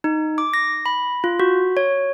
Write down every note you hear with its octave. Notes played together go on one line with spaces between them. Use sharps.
D#4
D6
A#6
B5
F4
F#4
C#5